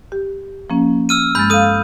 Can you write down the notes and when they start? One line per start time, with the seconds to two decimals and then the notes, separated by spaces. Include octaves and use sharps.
0.12 G4
0.70 F3 A#3 C#4
1.09 E6 F6 D#7
1.35 G2 G#3 B5 G6 A6
1.50 A4 F5 D#6 D#7